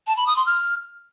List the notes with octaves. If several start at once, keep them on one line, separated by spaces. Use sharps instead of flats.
A5
B5
D#6
C6
F6